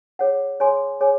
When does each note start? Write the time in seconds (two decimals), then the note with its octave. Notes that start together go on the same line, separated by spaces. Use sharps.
0.19 G#4 C#5 F#5
0.60 G#4 C#5 G#5 C6
1.01 G#4 C#5 G#5